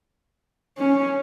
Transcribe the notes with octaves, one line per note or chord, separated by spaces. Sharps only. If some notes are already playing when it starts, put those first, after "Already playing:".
C#4